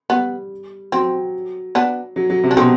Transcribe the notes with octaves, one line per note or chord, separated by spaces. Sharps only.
G3 B3
F#3 C4
B3 D4
F#3
F#3
C3
D4
B2 C4